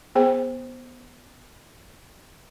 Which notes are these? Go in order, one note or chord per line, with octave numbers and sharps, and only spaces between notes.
B3 G#4 C5 G5